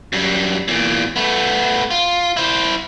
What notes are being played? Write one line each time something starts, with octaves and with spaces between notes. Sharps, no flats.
F#2 G3
E2 A#2
A3 B3
F4
E4 C5